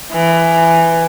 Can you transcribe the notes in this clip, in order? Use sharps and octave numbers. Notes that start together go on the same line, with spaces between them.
E3